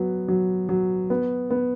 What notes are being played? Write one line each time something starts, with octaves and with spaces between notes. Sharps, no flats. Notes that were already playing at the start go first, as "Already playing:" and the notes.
Already playing: F#3 B3
F#3
F#3
B3
B3